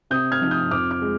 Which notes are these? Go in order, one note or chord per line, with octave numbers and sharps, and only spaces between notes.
C3 D#6 G6
F6 G#6
F3 C4 D#4
D#6 G6
F2 D6 F6
D6 F6
G#3